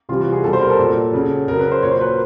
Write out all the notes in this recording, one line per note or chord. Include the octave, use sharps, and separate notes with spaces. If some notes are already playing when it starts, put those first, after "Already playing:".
C3 E3 G3 F4
F#4
G#4
B2 G3 A4
C5
A#4
A4
A#2 F#3
C#3 F#3
C#3 F#3 A#4
B4
C5
A#2 F#3 C#5
C5
B4
A#4